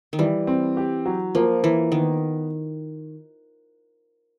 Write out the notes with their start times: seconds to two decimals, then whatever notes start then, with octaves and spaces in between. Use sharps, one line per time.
0.13 D#3
0.19 E3 G3
0.47 C4
0.77 G4
1.06 F#3
1.35 F3 A#3
1.63 E3 A#3
1.92 D#3 B3